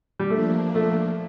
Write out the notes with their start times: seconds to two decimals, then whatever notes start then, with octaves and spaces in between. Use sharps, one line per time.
0.19 G3
0.30 F3 A3 A#3 D4
0.75 A3